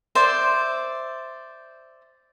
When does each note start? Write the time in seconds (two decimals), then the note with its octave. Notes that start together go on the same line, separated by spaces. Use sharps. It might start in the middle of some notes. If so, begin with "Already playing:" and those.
0.15 C5 D5 E5